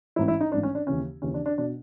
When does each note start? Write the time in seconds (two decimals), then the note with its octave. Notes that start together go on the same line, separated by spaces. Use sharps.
0.16 A1 G#2 E3 E4
0.28 E4
0.41 D#4
0.51 A1 G#2 E3 D4
0.63 C#4
0.75 D4
0.87 D#2 C#3 E3 C#4
1.22 D#2 C#3 E3 C#4
1.34 D4
1.46 D4
1.58 B2 D4